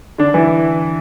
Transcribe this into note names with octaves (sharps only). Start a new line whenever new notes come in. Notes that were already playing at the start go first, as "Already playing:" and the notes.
D3 D4
E3 E4